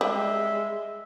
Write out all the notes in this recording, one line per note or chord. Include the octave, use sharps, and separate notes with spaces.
G3 G#3 E5